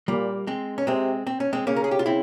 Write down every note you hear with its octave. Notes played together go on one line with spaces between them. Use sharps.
A#2 G3 A#3
G#3 C4
C#4
C3 G#3 C4
C4
C#4
G#3 C4
C#3 A#3 C#4
A#4
G#4
G4
F4
C4 E4